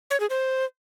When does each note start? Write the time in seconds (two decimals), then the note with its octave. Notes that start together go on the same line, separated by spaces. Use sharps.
0.11 C#5
0.20 G#4
0.30 C5